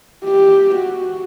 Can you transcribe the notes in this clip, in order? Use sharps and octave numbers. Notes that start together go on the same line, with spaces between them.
G4
F#4